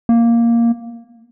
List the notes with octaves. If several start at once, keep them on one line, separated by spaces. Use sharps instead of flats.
A#3